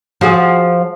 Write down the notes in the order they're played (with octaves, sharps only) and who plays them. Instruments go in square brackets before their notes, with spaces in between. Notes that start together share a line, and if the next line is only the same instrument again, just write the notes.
[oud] F3 F#4 G#4